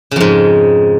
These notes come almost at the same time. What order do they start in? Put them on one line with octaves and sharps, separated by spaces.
C#3 F2 G#2